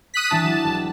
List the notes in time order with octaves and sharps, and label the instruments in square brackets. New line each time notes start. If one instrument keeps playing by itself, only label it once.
[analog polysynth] D#6 F#6 B6
[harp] E3 D4 D6 [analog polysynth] A5
[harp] F#3
E1